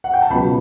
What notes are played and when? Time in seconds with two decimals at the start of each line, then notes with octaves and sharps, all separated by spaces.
0.04 F#5
0.14 G5
0.22 A5
0.30 C#2 B2 F#3 B3 B5